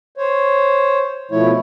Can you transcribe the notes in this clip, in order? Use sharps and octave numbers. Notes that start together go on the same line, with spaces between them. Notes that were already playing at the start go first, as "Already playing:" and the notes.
C5 C#5
B2 F3 A3 E4 C#5